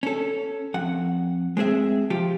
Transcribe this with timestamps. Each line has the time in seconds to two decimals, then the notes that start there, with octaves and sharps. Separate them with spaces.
0.03 C#4 A4
0.74 F2 F#5
1.57 G#3 C4 G#4 E5
2.10 F3 F4 G4